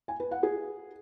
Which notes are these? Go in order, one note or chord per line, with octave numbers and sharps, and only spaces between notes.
G#5
B4
F#5
G#4